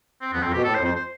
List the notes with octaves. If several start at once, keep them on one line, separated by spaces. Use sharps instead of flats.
C4
F2 B3
F2 C4
B2 G4
A2 A4
C5
F2
C5
C5